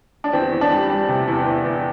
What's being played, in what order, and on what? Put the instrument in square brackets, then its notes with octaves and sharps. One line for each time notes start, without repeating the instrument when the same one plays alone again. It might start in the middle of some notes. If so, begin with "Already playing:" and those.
[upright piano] D4
E2 C4
E2
D4
G3
G3
C3
E2
E2
E2